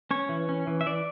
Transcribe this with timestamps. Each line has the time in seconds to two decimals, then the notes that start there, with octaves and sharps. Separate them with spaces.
0.11 C#4 C#5
0.29 E3
0.49 C#4
0.67 E3
0.81 E5
0.86 E3 D5